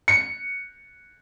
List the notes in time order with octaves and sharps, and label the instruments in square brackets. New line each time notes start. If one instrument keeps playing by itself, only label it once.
[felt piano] C#7